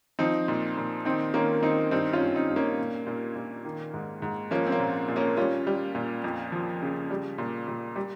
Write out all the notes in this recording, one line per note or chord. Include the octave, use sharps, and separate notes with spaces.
F3 C4 D#4
A#2
A#2
D#3 C4 D#4
D#3 A#3 C#4
D#3 C4 D#4
G2 C4 D#4
C#4 F4
G2
C#4
C4 D#4
G2
A#3 C#4
A#2
A#2
A#2
D#3
G#2
G#2
F3 A#3 C#4
C4
A#3 C#4
A#2
A#2
A#3 C#4
G3 C#4 F4
G3
A#2
F2
F3
C#3
G3
A#2
A#2
G3